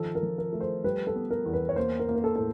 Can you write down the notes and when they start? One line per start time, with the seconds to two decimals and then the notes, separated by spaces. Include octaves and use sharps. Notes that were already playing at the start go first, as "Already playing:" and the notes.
Already playing: D#3 F3 A4
0.15 A#4
0.23 F3
0.38 A#4
0.53 A3
0.61 C5
0.84 G3 B4
1.07 A4
1.15 B3
1.31 A#4
1.46 E2
1.53 B4
1.69 C#5
1.76 A#3 C5
2.00 A#4
2.08 A#3
2.16 A#4
2.24 A4
2.36 A2 A4